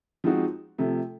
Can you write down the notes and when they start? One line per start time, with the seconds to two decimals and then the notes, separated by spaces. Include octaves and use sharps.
0.24 F3 G#3 C4 D#4 F#4
0.78 C3 F3 A3